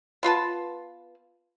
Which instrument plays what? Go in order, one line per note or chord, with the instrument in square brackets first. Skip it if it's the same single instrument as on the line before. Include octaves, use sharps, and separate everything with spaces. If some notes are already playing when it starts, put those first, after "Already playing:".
[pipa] B3 F4 B4 A5